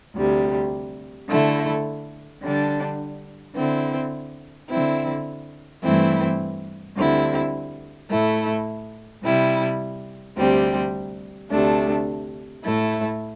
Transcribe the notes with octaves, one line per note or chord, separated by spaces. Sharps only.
D2 C3 G3
D3 A3 E4
D3 G3 D4
D3 C4 E4
D3 C4 E4
G2 E3 A3 C4 E4
D2 D3 G3 C4 E4
A2 A3 E4
C3 G3 E4
D2 C3 G3 C4
D2 C3 A3 D4
A2 A3 E4